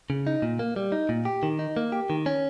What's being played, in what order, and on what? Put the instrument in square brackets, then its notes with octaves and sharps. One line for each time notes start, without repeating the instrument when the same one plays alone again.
[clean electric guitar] C#3
D#4
A#2
A#3
G3
D#4
A#2
G4
D#3
D#4
A#3
G4
D#3
C#4